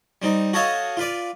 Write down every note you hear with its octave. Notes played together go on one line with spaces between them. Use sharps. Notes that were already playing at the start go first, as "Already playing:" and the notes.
G3 C4 D#4
F#4 A4 C#5 D#5 F5
F4 B4 D5